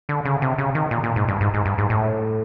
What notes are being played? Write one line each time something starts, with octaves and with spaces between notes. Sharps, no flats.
D3
C#3
C3
C#3
D#3
A#2
A#2
G#2
G2
G#2
G#2
G2
G#2
A2